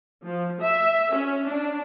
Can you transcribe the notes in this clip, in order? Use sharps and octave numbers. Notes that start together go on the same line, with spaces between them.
F3
E5
C#4
D4